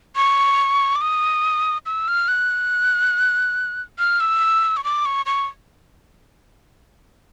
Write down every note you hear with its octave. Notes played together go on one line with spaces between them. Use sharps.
C#6
D6
D#6
E6
F6
F#6
F6
E6
C#6
D6
C#6
C#6